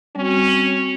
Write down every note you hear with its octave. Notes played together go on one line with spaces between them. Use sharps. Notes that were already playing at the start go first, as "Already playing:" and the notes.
G3 C4 C#4 F#4